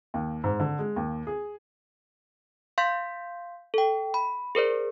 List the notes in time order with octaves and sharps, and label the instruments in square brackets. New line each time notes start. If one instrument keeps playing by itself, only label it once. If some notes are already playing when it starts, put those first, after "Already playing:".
[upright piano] D#2
G#2
D3
G#3
D#2
G#4
[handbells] F5 C6 G6 B6
A4 G5
B5
G#4 A#4 C5 D5